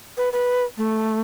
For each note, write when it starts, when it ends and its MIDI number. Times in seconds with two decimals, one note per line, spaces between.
0.17 0.29 71
0.33 0.64 71
0.77 1.21 57